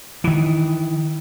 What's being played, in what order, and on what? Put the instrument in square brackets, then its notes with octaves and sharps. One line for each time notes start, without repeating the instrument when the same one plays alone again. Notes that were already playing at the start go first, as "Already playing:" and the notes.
[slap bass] D#3 E3